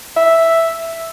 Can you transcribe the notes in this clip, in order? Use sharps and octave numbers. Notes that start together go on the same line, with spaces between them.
E5